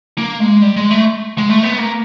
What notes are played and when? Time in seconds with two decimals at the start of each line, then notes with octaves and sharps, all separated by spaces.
0.18 A#3
0.40 G#3
0.62 G3
0.77 G#3
0.91 A3
1.38 G#3
1.49 A3
1.63 B3
1.78 A#3